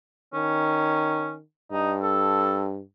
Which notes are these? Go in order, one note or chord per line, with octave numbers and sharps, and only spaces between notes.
D#3 C#4
G2 D#4
A4